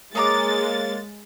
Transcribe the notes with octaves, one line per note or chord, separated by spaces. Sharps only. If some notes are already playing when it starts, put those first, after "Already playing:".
G#3 A#3 G#4 C#5 F5 A#5 D6 A6